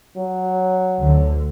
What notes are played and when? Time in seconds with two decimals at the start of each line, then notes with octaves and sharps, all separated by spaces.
0.17 F#3
0.99 D2 D3